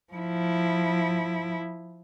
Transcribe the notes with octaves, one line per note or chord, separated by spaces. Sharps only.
F3 E4